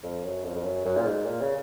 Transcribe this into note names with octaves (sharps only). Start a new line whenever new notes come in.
F2
F#2
F2
F2
F#2
F#2
A#2
G#2
A#2
C#3